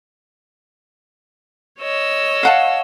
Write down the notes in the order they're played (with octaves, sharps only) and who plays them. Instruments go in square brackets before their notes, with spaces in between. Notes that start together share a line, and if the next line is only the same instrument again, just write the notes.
[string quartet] C#5 D#5 E6
[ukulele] F5 F#5 A5